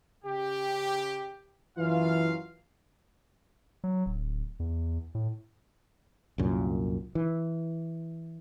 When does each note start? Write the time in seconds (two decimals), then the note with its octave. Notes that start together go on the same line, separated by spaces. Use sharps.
0.25 C#3 G4
1.78 F#2 E3 F4 F5
3.84 F#3
4.06 D1
4.60 E2
5.15 A2
6.38 C2 F#2 A#2
7.15 E3